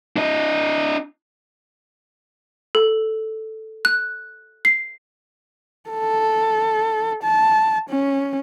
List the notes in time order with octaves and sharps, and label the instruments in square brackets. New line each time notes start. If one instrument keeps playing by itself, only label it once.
[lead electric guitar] D4 D#5
[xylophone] A4
F#6
C7
[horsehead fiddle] A4
A5
C#4